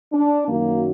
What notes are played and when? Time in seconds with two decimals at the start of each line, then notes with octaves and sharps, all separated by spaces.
0.13 D4
0.48 F#2 D#3 F#3 A#3